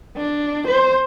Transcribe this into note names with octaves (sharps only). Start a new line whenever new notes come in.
D4
C5